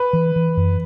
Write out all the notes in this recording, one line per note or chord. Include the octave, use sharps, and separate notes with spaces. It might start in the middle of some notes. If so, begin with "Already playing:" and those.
Already playing: B4
E3
E3
F#2